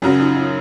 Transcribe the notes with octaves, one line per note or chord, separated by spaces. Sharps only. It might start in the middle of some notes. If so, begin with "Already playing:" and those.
F#2 C#3 F#3 C#4
D#4
D#4